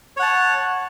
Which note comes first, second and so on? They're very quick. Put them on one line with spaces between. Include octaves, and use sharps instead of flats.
C#5 F#5 A5